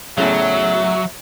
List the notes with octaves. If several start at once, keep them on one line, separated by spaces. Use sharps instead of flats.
E2 A2 C#3 F#3 E5